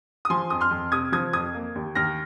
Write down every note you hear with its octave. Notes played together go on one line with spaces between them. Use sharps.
D#6
F3 G#5 C6
F2 D#6
C6 F6
F2
C3 D#6 G#6
F3 D#6 G#6
F2 D#6 G#6
A#3
D#2
D#2 F6 A#6